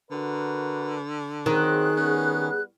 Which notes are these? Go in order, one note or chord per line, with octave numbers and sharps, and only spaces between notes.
D3 F#4 A#4 B4
D#3 F#3 C4 G#4 F#6
G3 B3 C#4